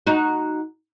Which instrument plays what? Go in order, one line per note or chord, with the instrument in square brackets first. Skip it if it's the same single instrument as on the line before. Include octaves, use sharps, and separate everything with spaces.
[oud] D#4 F#4